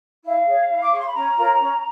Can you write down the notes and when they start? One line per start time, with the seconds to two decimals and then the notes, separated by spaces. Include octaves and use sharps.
0.23 E4 F5
0.46 G#4 C#5
0.70 E4
0.83 D6
0.91 G#4 C#5 C#6
0.98 C6
1.07 B5
1.14 C#4 A#5
1.37 F4 A#4 C#5
1.59 C#4